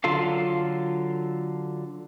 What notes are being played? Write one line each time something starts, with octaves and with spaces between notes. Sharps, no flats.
D3 F#3 F4 A4 F5